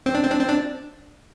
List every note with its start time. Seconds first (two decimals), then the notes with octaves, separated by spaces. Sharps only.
0.06 C4
0.15 D4
0.23 C4
0.31 D4
0.40 C4
0.49 D4